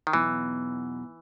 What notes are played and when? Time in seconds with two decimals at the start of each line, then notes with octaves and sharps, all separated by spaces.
0.07 D#3
0.13 E2 B2 E3 F#3 B3 D#4